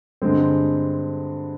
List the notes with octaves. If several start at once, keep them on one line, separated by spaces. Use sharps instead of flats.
G2 D3 G#3 C4